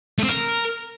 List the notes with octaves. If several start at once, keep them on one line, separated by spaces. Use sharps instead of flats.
A3
C4
A#4